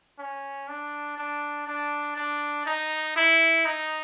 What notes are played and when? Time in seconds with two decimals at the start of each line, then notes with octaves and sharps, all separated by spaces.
0.19 C#4
0.69 D4
1.17 D4
1.67 D4
2.16 D4
2.66 D#4
3.16 E4
3.66 D#4